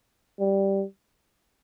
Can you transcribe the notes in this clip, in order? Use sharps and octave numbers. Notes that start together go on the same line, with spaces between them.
G3